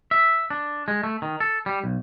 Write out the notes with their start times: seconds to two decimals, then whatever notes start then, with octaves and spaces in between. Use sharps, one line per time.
0.11 E5
0.50 D4
0.88 G#3
1.03 A3
1.22 D#3
1.40 A4
1.66 G3
1.84 B1